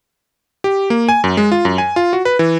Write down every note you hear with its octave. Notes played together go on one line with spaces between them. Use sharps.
G4
A#3
G#5
F#2
G#3
F4
F#2
G#5
F4
F#4
B4
E3